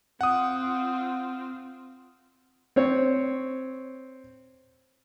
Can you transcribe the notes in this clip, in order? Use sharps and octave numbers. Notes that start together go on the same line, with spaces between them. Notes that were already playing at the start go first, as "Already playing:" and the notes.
C4 F4 F#5 D#6
C4 C#5